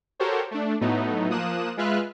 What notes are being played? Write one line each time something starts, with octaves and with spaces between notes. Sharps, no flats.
F#4 G4 A4 A#4 C5 C#5
A3 D4
A2 F#3 A3 B3 D#4
F3 A#3 D#6 F#6 E7
G#3 F4 B4 E5 F6 F#6